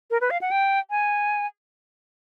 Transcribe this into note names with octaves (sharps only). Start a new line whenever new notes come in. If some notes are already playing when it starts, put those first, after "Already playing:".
A#4
B4
F5
F#5
G5
G#5